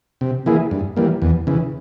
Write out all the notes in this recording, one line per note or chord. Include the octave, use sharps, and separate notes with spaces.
C3
E3 A#3 E4 G#4
G2
E3 G3 A#3
E2
C#3 E3